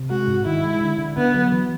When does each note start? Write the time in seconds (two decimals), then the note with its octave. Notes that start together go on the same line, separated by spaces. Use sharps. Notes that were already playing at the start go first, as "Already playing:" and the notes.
Already playing: C3
0.10 G#3 F#4
0.27 G#2
0.46 D#3 E4
0.63 G#3
0.81 D3
0.98 D3
1.17 D3 B3
1.34 F#3
1.52 E3